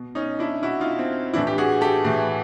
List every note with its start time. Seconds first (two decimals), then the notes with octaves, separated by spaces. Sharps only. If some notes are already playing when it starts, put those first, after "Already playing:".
Already playing: B2
0.15 C#4 D#4
0.39 D4 E4
0.63 B2 E4 F#4
0.80 D#4 F4
0.99 C4
1.34 A2 E3 D4 E4
1.47 G4
1.58 F#4 G#4
1.81 G4 A4
2.05 A2 E3